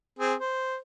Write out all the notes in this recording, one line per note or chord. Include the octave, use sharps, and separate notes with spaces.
C4 G#4
C5